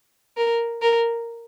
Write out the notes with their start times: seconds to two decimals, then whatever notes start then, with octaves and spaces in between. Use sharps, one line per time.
0.37 A#4
0.82 A#4